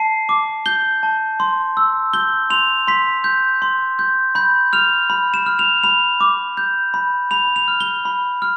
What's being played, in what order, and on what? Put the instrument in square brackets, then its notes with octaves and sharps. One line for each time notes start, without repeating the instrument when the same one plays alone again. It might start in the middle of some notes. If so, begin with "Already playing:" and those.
Already playing: [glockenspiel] A5 C7
D6
G6 G7
A5
C6
E6
G6 G7
C6 F7
C6 B6
G6
C6
G6
B5 G6
F6 F7
B5
E7
F6
F7
B5 F7
D6
G6
B5
B5 F7
F7
F6
G7
B5
F6